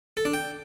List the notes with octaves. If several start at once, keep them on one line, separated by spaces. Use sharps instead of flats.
A4
D4
G5